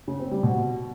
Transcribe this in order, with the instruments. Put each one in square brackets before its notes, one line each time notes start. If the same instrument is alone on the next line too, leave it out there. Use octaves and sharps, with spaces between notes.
[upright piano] C#3
C4
G3
B2